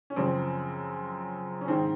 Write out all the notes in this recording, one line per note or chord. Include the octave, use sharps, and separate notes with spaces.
C#4
F#2 C#3 F3 C4
C#4
G#2 D#3 C4